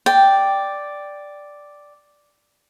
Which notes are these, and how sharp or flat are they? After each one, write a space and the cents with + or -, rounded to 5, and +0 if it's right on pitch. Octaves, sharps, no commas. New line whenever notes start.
D5 +0 G5 +0